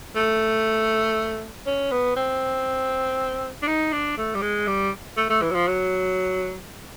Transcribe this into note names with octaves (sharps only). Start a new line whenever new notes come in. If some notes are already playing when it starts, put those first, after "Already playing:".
A3
C#4
B3
C4
D4
D#4
D4
A3
G3
G#3
G3
A3
A3
E3
F#3
F3
F#3